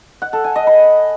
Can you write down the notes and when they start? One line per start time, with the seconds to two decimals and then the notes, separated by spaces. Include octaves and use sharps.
0.22 F#5
0.33 A4
0.44 G#5
0.56 D#5
0.67 B5